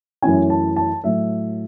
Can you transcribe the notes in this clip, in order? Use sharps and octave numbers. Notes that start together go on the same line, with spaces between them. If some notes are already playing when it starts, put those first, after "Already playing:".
F#2 E3 A3 C#4 E4 G#5
A5
A5
A2 F#3 A3 E5